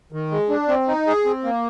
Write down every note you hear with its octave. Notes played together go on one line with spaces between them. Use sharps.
D#3
G#3
D4
C4
D#4
G#4
C4
A#3